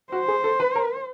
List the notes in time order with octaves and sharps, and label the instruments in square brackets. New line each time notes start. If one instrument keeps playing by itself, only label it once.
[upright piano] F#4 [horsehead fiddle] C5
[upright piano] G#4
A4
B4
A#4